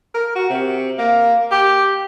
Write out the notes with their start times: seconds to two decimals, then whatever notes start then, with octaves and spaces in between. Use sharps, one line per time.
0.14 A#4
0.35 F#4
0.50 C3
0.98 A#3
1.51 G4